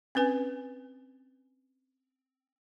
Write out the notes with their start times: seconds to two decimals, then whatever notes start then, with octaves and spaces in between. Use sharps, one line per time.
0.15 C4 C#4 B4 G#5